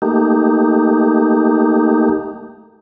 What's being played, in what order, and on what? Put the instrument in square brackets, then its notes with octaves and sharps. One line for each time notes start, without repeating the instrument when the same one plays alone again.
[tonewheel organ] A3 A#3 D#4 G4